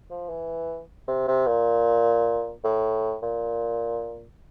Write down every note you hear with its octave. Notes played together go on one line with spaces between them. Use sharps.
F3
E3
C3
C3
A#2
A2
A#2